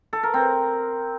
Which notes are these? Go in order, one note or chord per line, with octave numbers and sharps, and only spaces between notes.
A4
A#4
C4